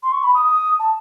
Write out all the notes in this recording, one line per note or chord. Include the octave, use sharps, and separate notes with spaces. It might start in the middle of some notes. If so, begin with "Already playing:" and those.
C6
C#6
B5
D#6
D#6
A5